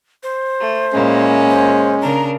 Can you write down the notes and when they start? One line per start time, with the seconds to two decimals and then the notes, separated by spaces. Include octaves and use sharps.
0.23 C5
0.60 A3
0.94 A#2 G#3 A#3 C#4 E4
1.50 C5
2.02 C#3 D4 A#4 A#5